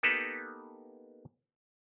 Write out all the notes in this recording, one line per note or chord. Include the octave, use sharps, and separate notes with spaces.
A#3 B3 D#4 G4 A4 B4